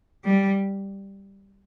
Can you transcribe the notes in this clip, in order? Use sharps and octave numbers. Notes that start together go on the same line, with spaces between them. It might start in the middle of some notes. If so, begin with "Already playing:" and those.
G3